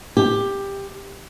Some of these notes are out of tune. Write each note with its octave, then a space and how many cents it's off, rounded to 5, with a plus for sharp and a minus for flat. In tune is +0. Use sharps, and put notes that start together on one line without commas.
G4 +10